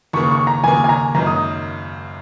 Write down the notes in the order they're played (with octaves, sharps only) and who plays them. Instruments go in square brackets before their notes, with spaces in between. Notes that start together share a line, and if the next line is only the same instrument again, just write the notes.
[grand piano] D#2 C#3 A#3 [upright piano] C#6
[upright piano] C#6
A#5
[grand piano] D#2 C#3 A#3 [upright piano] G#5
[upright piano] G#5
A#5
[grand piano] G#1 F#2 F#3 A#3 D#4 [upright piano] A#5
[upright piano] D#6